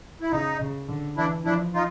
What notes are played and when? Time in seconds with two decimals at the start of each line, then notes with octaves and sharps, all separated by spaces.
0.21 E4
0.32 C#3 D#4
0.60 C#3
0.88 D3
1.17 E3 D4 E4
1.45 F3 D4 E4
1.74 D#4 F4